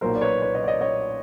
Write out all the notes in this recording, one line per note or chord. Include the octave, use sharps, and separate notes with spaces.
B1 A#2 F#3 A#4 C5
D5
B4 C#5
B4 C#5
C#5 D#5
D5
C#5 D#5
C#5 D#5